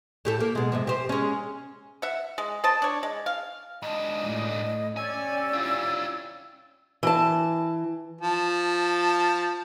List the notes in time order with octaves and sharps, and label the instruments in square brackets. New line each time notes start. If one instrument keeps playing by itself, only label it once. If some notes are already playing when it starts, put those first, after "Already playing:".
[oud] A2 G4 A4
A#3
B2 G#3
G#2 C3 F3
G4 C5
G#3 C#4
[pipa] E5 F#5
G#3
C4 C5 D#5 A5
D4 C#5
G#3
F5
[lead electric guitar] G#2 D4 [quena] D#5
[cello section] A2
[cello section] C#4 G4 D5 [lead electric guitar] G#5 [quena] E6
[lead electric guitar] E4 F4
[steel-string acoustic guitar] E3 A5
[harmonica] F3 A5